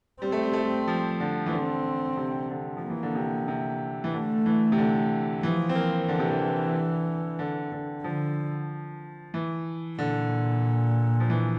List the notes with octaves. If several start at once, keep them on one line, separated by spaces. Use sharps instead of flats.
G3 C4
A3
G3
A3
G3
F3
D3
E3
D3 C4
C3
D3
F3
A#3
E3
D3
C3
C3
E3
D3 A3
E3
C3
D3
E3 F3
C4
A#3
D3 E3
C3
D3
D3
D3
D3 F3
E3
A#2 D3
F3
E3